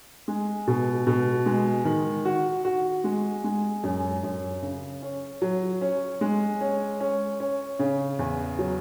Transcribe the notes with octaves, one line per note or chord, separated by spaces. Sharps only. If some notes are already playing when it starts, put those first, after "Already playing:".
G#3
B2
B2
G#3
D#3
F#4
F#4
G#3
G#3
F#2
F#2
C#3
C#4
F#3
C#4
G#3
C#4
C#4
C#4
C#3
E2
F#3